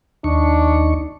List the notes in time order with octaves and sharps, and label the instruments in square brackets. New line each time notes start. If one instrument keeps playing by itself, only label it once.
[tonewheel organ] D#2 D#4 C#6 [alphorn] D4